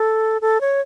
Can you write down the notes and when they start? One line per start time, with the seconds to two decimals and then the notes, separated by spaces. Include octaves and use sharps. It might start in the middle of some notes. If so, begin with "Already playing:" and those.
Already playing: A4
0.41 A4
0.61 C#5